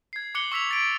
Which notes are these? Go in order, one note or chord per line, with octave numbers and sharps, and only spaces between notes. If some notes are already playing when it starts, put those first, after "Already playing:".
G#6 C7
D6 F#6 C#7 F#7 G7
C#6 E6 B6 F7
A6 D7